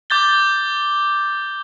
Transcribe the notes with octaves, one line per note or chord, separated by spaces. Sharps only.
D6 G6 A6 G7